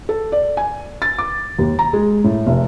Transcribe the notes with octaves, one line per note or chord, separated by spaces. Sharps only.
A4
D5
G#5
A6
D6
D#2
A#5
G#3
A2
F1